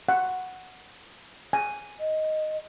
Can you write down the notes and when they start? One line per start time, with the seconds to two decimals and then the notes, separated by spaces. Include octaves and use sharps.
0.09 F#5
1.53 G#5
2.00 D#5